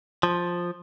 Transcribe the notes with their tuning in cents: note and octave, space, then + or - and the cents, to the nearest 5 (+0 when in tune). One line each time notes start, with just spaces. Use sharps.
F3 +5